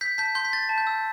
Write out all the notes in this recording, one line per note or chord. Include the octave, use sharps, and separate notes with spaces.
G6 B6
A5 G6 B6
C6 G6
B6
G6 A6
A5
G6
E6